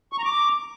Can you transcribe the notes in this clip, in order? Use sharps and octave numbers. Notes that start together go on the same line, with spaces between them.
C#6
A#5
D6